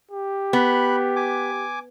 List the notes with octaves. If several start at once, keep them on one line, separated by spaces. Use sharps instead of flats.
G4
B3 B5 F#6
G#5 D6